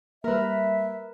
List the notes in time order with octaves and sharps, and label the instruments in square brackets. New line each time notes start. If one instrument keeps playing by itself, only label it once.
[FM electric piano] G3 A#3 [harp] A#4 B4 [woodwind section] E5